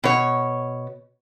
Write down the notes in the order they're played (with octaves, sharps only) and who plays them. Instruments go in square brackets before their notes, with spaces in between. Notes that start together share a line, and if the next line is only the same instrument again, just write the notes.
[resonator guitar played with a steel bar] B2 C#5